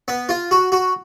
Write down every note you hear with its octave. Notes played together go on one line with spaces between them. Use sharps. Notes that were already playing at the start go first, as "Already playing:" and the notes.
B3
F4
F#4
F#4